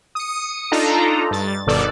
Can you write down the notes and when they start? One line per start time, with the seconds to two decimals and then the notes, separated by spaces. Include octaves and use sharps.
0.15 D#6 C#7
0.72 D4 D#4 F4 A4 A#5
1.31 G2 A6
1.67 G1 B2 D#3 A4 D5